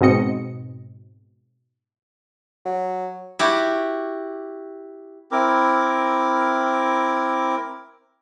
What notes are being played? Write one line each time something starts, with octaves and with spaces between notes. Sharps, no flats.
G#2 B2 C4 D#5 C#7
F#3
E4 F#4 G4
C4 E4 A#4 D6